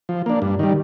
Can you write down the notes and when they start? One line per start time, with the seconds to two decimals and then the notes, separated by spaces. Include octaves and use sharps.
0.09 F3
0.26 A#3 D4
0.42 G2
0.59 D#3 G3